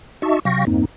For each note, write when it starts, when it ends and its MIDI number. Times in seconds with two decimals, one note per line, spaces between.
0.22 0.40 63
0.22 0.40 66
0.22 0.40 75
0.22 0.40 76
0.22 0.40 81
0.22 0.40 85
0.45 0.65 48
0.45 0.65 54
0.45 0.65 77
0.45 0.65 79
0.45 0.65 85
0.45 0.65 94
0.67 0.85 40
0.67 0.85 43
0.67 0.85 58
0.67 0.85 60
0.67 0.85 63